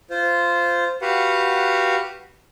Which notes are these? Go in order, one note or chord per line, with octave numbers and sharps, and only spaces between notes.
F4 C5
F#4 G4 B4 F5 F#5